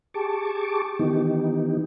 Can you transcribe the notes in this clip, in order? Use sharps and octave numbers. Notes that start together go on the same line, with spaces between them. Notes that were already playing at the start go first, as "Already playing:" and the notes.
G4 G#4 A5 C#6 D6
D#3 E3 B3 D#4 G4